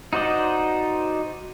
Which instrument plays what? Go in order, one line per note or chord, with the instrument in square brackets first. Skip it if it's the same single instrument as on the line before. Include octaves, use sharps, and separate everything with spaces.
[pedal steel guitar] D#4 F#4 C5 D5 D#5